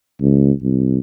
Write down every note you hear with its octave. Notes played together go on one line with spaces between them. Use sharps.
C#2
C2